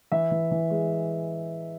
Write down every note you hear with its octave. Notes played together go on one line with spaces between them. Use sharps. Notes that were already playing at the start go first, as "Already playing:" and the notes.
E3 E5
E3
E3
G#3